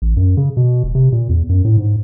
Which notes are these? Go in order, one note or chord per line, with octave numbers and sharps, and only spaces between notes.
A1
F#2
C#3
B2
E1
C3
A#2
E2
F#2
A2
G#2